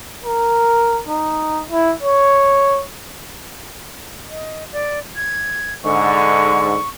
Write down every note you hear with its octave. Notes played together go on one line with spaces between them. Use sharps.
A#4
D#4
E4
C#5
D#5
D5
G#6
G#2 D3 C#6